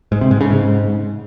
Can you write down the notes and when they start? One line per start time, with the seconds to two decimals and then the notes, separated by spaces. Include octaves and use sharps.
0.12 G#2
0.21 C3
0.31 G#2
0.41 C#3
0.50 G#2